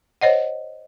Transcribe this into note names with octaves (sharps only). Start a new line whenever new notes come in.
C5 C#5 D#5 F#5